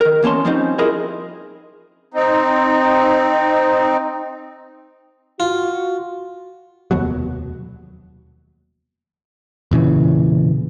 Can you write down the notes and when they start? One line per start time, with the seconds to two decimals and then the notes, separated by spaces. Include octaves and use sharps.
0.01 D#3 A#4
0.23 E2 A#3 C#4 A5 C6
0.45 F3 G3 C4 C#4 D#4
0.78 E4 F4 G#4 A#4 D#5
2.13 C4 D#4
5.40 F4 F#4
6.91 F1 D#2 B2 F#3
9.71 E1 A#2 C#3 E3